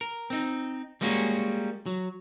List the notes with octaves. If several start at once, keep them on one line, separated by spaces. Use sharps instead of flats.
A#4
C4 D#4
G3 G#3 A#3 C#4 F#4
F#3